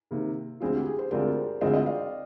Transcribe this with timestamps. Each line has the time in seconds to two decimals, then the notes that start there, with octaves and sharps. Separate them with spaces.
0.11 C3 D#3 A#3
0.60 D2 D3 G#3 C4 F4 G#4
0.73 G4
0.85 G#4
0.98 G#4 C5
1.11 D2 D3 G#3 C4 F4 A#4 D5
1.61 D2 D3 G#3 C4 F4 C5 D#5
1.73 D#5 G5
1.86 D5 F5